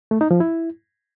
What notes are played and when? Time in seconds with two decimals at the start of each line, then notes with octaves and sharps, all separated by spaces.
0.11 A3
0.21 D#4
0.31 F3
0.40 E4